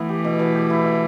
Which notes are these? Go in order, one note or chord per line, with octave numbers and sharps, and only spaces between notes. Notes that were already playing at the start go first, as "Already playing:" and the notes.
Already playing: E3 A3 B3 E4
G4
B2
B2
G4
E4
E4